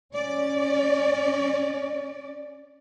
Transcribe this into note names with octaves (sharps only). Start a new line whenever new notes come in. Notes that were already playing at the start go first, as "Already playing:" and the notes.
C#4 D5